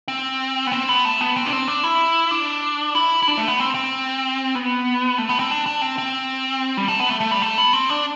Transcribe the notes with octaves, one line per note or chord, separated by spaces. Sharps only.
C4
B3
C4
B3
A3
B3
C4
D4
C4
D4
E4
D4
E4
E4
D4
A3
B3
C4
C4
B3
A3
B3
C4
D4
D4
C4
C4
G3
A3
B3
A3
A3
G3
A3
B3
C4
D4